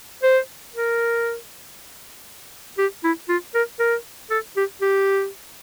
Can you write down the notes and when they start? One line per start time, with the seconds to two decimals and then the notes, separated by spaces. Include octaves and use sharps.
0.23 C5
0.74 A#4
2.78 G4
3.04 E4
3.29 F4
3.55 A#4
3.80 A#4
4.30 A4
4.57 G4
4.81 G4